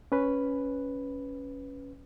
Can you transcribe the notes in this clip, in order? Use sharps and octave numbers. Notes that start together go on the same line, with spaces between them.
C#4 B4